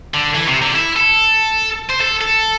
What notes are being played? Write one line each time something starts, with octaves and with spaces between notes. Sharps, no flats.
D3
E3
C3
D3
G4
E4
A4
C5
A4
A4